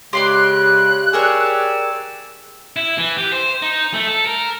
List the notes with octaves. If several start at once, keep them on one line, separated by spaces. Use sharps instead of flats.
C#3 G#3 G4 B4 D5 C6
F#6
G4 G#4 A#4 C#5 D5 E6
E4
E3
G4
C5
D#4
A3
A4
A#4